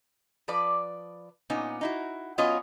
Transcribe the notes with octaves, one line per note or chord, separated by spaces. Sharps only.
F3 B4 D5
A#2 B3 C#4 D#4
D#4 E4 F#4
F#3 B3 C#4 F4 C#5 D#5